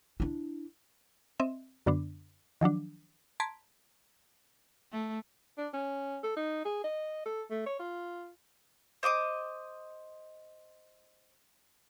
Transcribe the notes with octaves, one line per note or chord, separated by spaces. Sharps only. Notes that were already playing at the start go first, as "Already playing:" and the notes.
D4 E4
C4 D#5 E5
F#2 D3 B3 D4
D#3 F3 F#3 D4
A5 A#5 C6 G#6 B6 D7
A3
D4
C#4
A4
D#4
G#4
D#5
A4
A3
C#5
F4
C5 D#5 D6 D#6